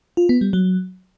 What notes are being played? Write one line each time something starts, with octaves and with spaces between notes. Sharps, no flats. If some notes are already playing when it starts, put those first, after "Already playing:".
F4
B3
G3
F#3